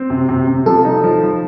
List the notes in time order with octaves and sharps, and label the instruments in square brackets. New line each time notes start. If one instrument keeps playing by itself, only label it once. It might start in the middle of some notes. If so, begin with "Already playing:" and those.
Already playing: [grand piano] C4
C3
C3
C3
[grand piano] F3 [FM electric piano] A4
[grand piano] D#4
F3
F3